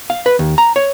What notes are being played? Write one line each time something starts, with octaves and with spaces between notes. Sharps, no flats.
F5
B4
D#2
A#5
C#5